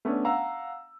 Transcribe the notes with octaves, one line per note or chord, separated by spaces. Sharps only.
A3 B3 C#4 D4
F5 F#5 A#5 E6